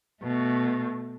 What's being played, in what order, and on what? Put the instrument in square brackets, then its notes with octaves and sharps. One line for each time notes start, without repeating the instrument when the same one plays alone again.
[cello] B2 A3